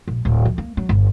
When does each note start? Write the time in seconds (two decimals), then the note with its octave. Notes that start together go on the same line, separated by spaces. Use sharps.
0.08 A#1
0.25 D1
0.45 F2
0.58 A#3
0.77 F#3
0.89 G1